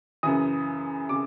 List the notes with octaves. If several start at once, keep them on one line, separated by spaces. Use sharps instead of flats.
F#2 C#3 E3 D#6
C#3 D6